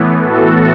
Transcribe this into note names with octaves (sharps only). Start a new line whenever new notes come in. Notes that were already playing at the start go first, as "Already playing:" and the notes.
Already playing: A2 E3 B3
F#4 A4